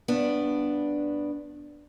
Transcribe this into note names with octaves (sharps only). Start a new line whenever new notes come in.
G2 B3 D4